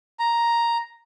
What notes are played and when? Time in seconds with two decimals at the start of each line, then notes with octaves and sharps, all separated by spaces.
0.20 A#5